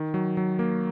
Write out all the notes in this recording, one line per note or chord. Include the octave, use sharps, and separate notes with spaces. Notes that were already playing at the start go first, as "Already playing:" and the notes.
Already playing: D#3
F#3
F#3
A#3